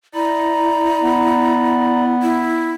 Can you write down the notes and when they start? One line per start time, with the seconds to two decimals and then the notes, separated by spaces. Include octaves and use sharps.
0.14 E4 D5 A#5 B5
1.03 B3
2.22 E4